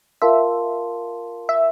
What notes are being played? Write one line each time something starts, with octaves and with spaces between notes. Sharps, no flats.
F4 A#4 E5 F5 A5 C6
E5